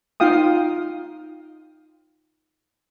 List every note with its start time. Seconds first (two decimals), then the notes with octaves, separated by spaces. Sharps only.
0.20 D#4 F4 F5 G5 D#6